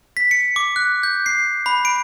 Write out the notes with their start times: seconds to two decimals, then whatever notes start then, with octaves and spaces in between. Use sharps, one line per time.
0.17 B6
0.31 C#7
0.56 D6
0.76 F#6
1.03 G6
1.26 C7
1.66 B5
1.85 D7